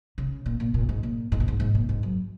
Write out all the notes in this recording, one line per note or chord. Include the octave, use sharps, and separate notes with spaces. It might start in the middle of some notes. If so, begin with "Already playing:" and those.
C#3
A#2
A#2
A#2
G#2
A#2
G#2
A#2
G#2
G#2
A#2
G#2
F#2